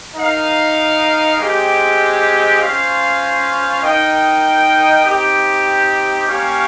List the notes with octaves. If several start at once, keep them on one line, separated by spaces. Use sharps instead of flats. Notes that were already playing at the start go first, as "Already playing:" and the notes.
D#4 A#4 F5
G#3 C4 G4
C#4 F4 C5 F5
D#4 A#4 D#5 G5
C4 D#4 G4
A#3 C#4 G4 C#5 F5